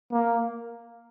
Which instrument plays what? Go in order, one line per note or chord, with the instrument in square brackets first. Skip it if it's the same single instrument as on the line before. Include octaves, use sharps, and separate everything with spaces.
[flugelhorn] A#3